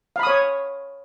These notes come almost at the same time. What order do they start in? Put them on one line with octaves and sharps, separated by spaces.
F5 B5 D#6 C#5